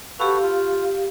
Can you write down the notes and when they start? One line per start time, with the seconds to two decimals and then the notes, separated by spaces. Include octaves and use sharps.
0.19 F#4 G4 A4 B4 F5
0.43 F4